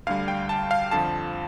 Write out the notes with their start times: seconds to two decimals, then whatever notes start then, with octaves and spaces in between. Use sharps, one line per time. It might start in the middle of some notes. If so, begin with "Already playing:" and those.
0.07 D2 D3 G3 F5
0.28 G5
0.49 A5
0.71 F5
0.91 F2 D3 F3 A5